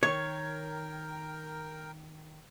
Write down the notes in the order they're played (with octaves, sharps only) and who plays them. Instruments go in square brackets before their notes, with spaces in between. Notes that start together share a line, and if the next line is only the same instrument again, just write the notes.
[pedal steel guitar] D#3 [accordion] A#4 G5 [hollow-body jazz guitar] C#5 [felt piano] G#6